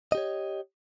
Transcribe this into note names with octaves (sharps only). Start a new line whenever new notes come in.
G4 C#5 D#5